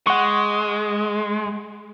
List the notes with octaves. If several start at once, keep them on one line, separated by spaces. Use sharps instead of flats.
G#3 F#5 C#6